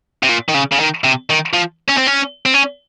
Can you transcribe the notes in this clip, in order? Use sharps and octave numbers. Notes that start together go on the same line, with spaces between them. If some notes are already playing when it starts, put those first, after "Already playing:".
C3
A#2
D#3
C#3
C#3
D#3
C3
D#3
F3
C#4
C4
C#4
C4
C#4